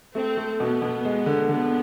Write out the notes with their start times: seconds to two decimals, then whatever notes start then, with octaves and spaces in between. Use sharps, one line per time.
0.15 A3 C4
0.37 A3
0.60 B2 B3
0.82 B2
1.05 G#3
1.26 D3
1.49 D3 B3